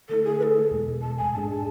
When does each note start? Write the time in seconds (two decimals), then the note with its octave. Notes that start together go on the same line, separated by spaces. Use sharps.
0.09 D3 A3 E4 A4
0.24 G#4
0.39 B4
0.43 A4
0.71 E2 B2 G#3
1.02 A5
1.18 G#5
1.33 G#2 G#3 D4 G#4 A5
1.49 A5